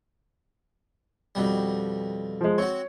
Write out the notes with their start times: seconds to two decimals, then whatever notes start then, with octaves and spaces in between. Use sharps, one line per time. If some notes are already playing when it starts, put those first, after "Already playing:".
1.35 F2 B2 G3
2.41 F3 G#3
2.58 C4 F#4 C#5